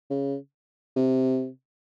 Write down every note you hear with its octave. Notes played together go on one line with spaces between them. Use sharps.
C#3
C3